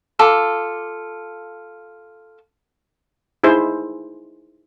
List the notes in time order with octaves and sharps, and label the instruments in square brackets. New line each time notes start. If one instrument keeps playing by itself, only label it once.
[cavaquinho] F4 A4 D6
[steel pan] D#4 E4 G#4 C5